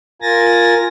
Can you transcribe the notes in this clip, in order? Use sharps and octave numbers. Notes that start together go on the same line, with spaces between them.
F4 A#4 G#5 A6 A#6